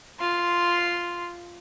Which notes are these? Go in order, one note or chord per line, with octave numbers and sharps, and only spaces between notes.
F4 C6